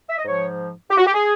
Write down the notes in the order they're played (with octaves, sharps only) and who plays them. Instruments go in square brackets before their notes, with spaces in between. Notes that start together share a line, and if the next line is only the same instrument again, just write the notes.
[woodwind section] E5
D#5
G#2 F3 C#5
G4
F#4
G4
G#4